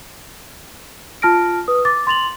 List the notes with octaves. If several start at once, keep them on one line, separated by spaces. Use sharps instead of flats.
F4 A5 F6 A#6 D7
B4 D#6
D6 A6
C6 A6 F7 F#7